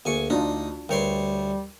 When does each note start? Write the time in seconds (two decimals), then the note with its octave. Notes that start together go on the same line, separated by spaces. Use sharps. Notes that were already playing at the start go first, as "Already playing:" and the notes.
0.05 D2 A#3 G#4 G#5 C#6
0.30 D2 D4 D#4 F4
0.89 D2 G3 A#4 B4 C#5 G5 C6